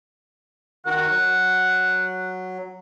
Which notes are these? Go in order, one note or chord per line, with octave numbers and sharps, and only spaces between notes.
D#3 F#4 A#4 F#5
F#3